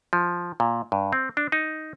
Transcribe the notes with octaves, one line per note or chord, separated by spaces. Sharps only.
F3
A#2
G2
C4
D4
D#4